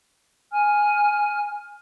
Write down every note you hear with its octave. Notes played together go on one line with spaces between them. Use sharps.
G#5 F6